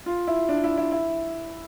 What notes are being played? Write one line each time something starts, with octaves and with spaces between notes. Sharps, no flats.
F4
E4
D4
E4
E4
E4